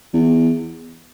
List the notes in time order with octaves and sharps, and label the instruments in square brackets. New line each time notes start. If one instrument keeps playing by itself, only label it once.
[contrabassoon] E2